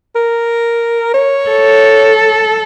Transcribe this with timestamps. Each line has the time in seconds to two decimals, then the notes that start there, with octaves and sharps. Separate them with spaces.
0.15 A#4
1.14 C#5
1.50 A4